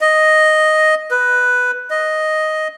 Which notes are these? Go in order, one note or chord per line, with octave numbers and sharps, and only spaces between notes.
D#5
B4
D#5